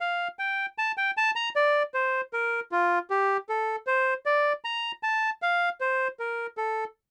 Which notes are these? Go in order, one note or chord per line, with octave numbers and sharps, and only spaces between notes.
F5
G5
A5
G5
A5
A#5
D5
C5
A#4
F4
G4
A4
C5
D5
A#5
A5
F5
C5
A#4
A4